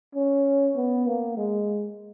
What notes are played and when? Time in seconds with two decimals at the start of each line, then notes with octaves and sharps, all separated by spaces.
0.15 C#4
0.76 B3
1.07 A#3
1.37 G#3